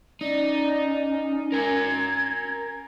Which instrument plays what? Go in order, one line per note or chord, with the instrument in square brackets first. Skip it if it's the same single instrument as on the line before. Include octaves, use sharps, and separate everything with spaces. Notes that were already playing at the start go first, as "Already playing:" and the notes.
[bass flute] C#4 [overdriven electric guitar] D#4 [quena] D5
[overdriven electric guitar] A#4 G#5 [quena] G#6